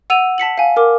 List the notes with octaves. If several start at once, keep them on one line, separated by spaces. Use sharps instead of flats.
F#5 E6 D#7 F7
A5 B6 C#7 F#7
F5 G#5
A#4 D6